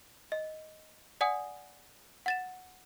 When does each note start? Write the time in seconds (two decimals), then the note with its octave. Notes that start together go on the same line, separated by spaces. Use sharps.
0.32 D#5
1.21 D5 F#5 G#5 D#6
2.26 F#5 A6 E7